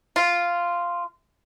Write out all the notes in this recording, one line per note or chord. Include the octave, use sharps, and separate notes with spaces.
F4